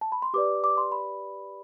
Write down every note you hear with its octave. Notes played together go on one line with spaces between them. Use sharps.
A5
B5
C6
G4 B4 D5 D6
D6
C6
B5